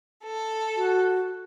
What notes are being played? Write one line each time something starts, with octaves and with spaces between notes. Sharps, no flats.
A4
F#4